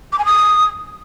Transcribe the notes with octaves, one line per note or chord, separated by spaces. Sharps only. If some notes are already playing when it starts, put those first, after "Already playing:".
D6
G#5
D#6